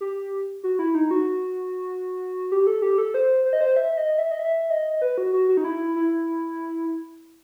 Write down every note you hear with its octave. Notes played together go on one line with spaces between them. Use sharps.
G4
F#4
E4
D#4
F#4
G4
A4
G4
A4
C5
C5
D#5
C5
E5
D#5
E5
D#5
E5
D#5
B4
F#4
F#4
F#4
D#4
E4
E4